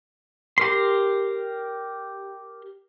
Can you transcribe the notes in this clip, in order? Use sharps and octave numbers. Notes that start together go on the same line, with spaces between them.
G4 A#4 C6